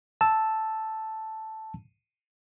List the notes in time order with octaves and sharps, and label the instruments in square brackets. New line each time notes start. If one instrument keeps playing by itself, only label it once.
[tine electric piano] A5 E6